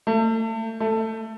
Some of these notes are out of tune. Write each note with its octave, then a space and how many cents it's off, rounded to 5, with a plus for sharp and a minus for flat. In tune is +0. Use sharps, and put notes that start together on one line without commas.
A3 +35
A3 +15